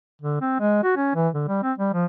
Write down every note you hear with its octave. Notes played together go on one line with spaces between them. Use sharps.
D3
C4
G#3
F#4
C#4
E3
D3
G3
C4
G3
F3